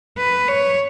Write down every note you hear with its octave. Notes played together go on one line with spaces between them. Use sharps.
B4
C#5